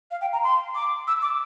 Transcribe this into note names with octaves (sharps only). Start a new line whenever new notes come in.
F5
G5
A#5
C6
D6
E6
D6